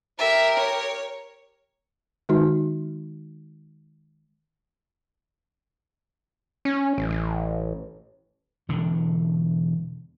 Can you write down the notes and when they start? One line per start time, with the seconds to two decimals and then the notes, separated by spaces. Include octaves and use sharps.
0.19 G4 A#4 E5
0.57 C#5
2.29 D#3 G#3 D#4 F#4
6.65 C#4
6.98 A1
7.11 A1
8.69 E1 D3